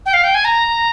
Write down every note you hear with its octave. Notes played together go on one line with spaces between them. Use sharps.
G5
F5
G5
G#5
A#5